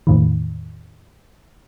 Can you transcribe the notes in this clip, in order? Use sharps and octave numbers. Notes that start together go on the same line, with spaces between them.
E2 A2 D#3